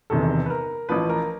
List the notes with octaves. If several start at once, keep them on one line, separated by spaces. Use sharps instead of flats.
E1 E2 C3 D#3 A4
B4
A#4
A1 A2 F3 B4
A#4